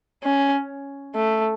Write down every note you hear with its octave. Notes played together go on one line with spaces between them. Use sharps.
C#4
A3